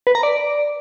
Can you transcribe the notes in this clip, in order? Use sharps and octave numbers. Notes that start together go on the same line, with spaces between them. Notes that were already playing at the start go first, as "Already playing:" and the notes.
B4
A#5
D5